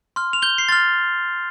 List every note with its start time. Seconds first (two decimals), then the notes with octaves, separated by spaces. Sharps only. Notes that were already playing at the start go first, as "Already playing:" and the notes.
0.16 C6 F6
0.33 F7
0.42 G6 G7
0.58 C7
0.69 C6 F6 A6